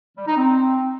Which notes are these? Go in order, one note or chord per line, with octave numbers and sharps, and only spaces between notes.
G3
D#4
C4